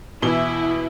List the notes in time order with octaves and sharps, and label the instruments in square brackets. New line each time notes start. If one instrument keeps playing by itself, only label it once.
[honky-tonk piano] B2 [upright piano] E3 G7 [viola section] E4